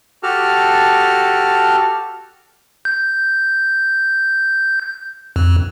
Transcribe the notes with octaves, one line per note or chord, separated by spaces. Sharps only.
F#4 G4 A4 A5 F6
G6
F2